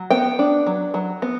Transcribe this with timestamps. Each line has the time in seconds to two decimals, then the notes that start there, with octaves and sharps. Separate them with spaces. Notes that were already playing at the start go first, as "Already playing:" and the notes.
Already playing: F#3
0.10 B3 G5
0.39 D4
0.67 F#3
0.94 F#3
1.22 B3